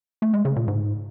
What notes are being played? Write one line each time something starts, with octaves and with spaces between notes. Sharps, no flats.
A3
G#3
C#3
A#2
G#2